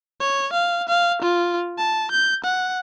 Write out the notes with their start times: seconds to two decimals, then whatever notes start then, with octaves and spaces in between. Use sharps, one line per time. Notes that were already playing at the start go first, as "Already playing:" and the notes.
0.20 C#5
0.53 F5
0.89 F5
1.22 F4
1.78 A5
2.12 G6
2.44 F#5